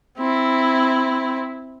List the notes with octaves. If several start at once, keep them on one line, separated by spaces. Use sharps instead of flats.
C4 E4